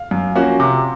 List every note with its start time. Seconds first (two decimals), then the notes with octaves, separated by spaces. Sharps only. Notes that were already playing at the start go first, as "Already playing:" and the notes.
Already playing: F5
0.11 F#2
0.35 F3 A#3 C#4 F#4
0.60 C3